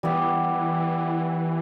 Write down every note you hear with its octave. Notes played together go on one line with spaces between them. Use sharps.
E3 G3 B3 G4